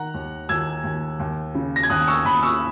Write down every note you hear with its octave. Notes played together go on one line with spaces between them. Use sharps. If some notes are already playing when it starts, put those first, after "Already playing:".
Already playing: D#3 F#5 A#5
D#2
D#2 E6 G#6
D#2
D#2
C#3
A#6
G#6
D#2 D#6 F#6
C#6 E6
D#2 B5 D#6
C#6 E6